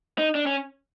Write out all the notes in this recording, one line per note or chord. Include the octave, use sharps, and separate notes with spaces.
D#4
D4
C#4